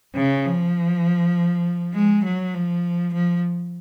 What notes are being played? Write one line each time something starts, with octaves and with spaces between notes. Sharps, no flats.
C#3
F3
G#3
F#3
F3
F3